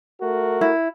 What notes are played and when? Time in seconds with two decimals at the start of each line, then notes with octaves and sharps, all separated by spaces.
0.21 A3 F#4 A#4
0.61 E4